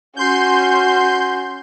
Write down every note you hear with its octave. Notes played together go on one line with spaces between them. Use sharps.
C#4 F#4 C6 G6